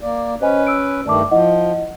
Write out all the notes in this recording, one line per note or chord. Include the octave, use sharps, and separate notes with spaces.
A#3 D5
C#4 B4 C5 D#5 G#5
E6 D7
G2 D#3 A3 D5 A5 D6
F3 E4 D#5 F#5